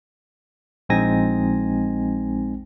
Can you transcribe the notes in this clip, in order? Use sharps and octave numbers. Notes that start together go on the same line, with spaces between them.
A#1 G#3 C4 D#4 G#5 A#6